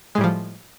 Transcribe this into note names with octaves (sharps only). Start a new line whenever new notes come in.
A2 F3 G3 G#3